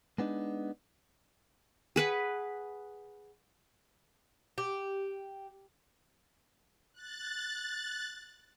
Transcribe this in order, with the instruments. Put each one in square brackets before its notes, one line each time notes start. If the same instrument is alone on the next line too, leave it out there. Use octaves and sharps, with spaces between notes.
[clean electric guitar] G#3 B3 D4 D#4
[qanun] G#4 B4 F#5
[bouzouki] G4
[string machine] F#6 A6